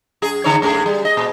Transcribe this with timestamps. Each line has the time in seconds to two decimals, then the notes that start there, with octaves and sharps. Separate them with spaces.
0.22 F#2 G#4
0.44 D3 D#4 C#5
0.62 F#2 A3 G#4
0.86 G3
1.05 D#5
1.17 A#2